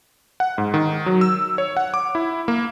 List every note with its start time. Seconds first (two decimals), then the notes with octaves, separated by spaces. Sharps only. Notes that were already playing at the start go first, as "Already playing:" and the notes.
0.40 F#5
0.58 G#2
0.74 D#3
1.06 F#3
1.21 E6
1.58 C#5
1.77 F#5
1.94 D6
2.15 E4
2.48 A#3